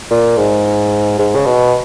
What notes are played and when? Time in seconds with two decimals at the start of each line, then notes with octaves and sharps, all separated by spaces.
0.11 A#2
0.38 G#2
1.19 G#2
1.35 C#3
1.46 B2